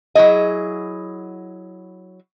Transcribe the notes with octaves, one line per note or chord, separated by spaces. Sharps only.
F#3 E4 G#4 D#5